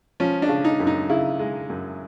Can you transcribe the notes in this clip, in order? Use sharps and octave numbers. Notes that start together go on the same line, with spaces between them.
F3 C#4
D4
C#3
D#4
F#2
D#4
C#3 E4
G#3
F#2